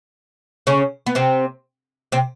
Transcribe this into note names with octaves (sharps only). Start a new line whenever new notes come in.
C#3 C#4
B3
C3 C4
C3 C4